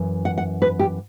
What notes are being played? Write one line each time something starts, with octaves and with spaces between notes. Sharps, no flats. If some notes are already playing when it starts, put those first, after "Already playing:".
Already playing: F#2 E3
F#5
F#5
B4
G4